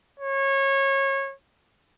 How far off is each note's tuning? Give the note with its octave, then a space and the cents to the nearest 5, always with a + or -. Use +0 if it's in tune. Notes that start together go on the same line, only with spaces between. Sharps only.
C#5 -25